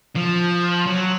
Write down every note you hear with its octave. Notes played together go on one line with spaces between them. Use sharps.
F3
F#3